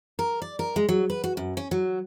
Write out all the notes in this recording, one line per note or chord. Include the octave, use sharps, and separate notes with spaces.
A#4
D5
A#4
G#3
F#3
B4
F#4
F#2
C#4
F#3